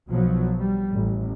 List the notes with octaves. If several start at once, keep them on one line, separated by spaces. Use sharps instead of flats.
B1 B2 F3 F#3
G3
A1